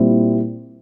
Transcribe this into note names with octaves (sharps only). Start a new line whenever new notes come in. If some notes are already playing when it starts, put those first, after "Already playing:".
Already playing: A#2 G3 C4 E4